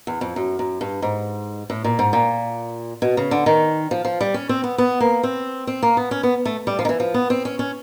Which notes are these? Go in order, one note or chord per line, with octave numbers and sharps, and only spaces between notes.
E2
F2
F#2
F#2
G2
G#2
A2
A#2
G#2
A#2
B2
C#3
D3
D#3
F3
F3
G3
C#4
C4
B3
B3
A#3
C4
C4
A#3
B3
C#4
B3
A3
G3
F3
D#3
E3
F3
B3
C4
C#4
C#4